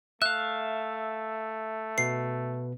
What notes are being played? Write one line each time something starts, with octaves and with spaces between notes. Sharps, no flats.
A3 E5 F5 F#6
B2 B3 B4 C7